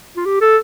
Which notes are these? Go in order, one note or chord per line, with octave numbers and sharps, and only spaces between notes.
F4
G4
A4